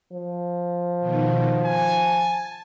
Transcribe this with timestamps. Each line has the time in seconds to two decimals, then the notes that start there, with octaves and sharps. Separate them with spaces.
0.13 F3
1.00 B2 D#3
1.66 G#5 A5